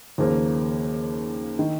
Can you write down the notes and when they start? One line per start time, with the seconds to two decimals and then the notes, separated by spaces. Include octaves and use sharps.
0.18 D#2 C#3 F3 A#3
1.59 D#3